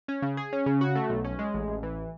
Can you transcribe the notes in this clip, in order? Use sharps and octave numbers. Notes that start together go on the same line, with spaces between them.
C#4
C#3
G#4
C#4
C#3
F#4
A3
B1
C#4
G#3
A1
A1
E3